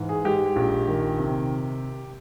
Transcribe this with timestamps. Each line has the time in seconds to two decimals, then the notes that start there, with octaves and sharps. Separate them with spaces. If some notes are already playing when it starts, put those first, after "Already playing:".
Already playing: G#2 E3
0.09 G#4
0.25 G#3 G4
0.56 A#1
0.88 D#3
1.19 C3